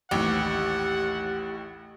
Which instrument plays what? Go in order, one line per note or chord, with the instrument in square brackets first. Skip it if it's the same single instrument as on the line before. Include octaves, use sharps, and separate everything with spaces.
[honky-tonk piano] A1 A2 [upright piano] D#2 E3 [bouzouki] G4 [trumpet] F#5